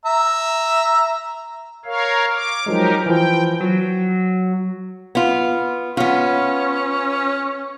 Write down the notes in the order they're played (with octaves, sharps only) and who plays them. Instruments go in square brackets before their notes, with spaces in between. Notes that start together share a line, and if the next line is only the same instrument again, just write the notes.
[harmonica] E5 A#5
[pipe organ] A#4 C#5 F5
D6
[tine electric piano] F3 F#3 G#3 [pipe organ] D#4 G4 A#4
[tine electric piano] E3 F3 [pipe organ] G5
[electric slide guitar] F#3
[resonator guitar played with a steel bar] B3 F4
[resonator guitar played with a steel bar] B3 F4 [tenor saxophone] C#4